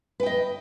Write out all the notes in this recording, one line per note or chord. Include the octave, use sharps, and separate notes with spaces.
B4 D#5 G5